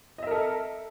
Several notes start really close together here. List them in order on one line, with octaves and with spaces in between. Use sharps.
D#5 E5 A#4 A4